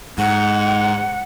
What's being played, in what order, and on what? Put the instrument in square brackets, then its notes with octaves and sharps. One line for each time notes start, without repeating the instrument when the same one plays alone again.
[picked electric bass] G#2 [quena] F#5